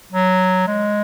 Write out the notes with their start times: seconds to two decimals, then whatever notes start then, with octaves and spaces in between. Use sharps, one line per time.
0.12 F#3
0.67 G#3